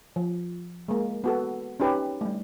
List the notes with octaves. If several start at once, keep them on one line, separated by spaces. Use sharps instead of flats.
F3
G#3 A#3
B3 F#4 A4
C#4 D#4 G4 B4
G3 A3